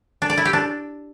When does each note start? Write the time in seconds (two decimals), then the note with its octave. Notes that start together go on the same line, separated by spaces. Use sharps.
0.22 D4
0.30 D5
0.37 E4
0.45 G4
0.53 D4